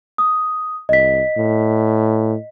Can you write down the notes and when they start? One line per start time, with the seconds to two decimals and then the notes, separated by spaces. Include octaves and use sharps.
0.18 D#6
0.89 C2 D#5 B6
1.37 A2